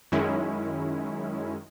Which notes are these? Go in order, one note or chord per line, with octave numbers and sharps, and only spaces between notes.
F#2 D#3 G#3 C#4 E4